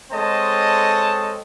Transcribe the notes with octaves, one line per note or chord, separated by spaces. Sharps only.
G#3 C4 A4 C#5 D#5 A5